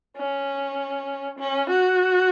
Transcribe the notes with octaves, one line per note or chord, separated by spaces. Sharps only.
C#4
C#4
F#4